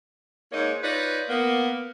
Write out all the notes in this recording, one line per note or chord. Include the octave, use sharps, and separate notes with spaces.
G#2 A#3 D#4 C#5
D#4 F4 B4 C#5 D5
A#3 B3